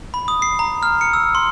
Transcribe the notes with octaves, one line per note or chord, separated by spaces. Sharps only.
B5
D#6
C7
A#5
F6
C#7
E6
C6